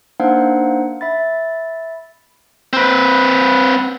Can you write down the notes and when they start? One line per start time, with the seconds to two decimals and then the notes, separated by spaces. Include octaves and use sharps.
0.20 A#3 D4 D#4 C5 F5 F#5
1.01 E5 B5 A6
2.73 C4 B4